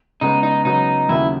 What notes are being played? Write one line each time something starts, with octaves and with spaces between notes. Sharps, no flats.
C#3 G#3 B3 D#4
D#4
C#3 F#3 B3 D#4
D#2 C#3 F#3 E4